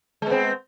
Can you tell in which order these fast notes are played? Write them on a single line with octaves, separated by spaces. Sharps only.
G#3 B3 C4